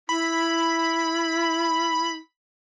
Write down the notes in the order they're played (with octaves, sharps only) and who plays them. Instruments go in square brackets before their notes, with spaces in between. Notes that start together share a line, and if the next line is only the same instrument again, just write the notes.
[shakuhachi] E4 [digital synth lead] B5